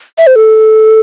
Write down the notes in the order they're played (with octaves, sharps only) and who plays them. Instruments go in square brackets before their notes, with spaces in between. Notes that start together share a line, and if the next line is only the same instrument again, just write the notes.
[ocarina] E5
C5
A4